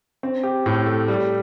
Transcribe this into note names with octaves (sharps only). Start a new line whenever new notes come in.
C4
G4
A2
A3
G3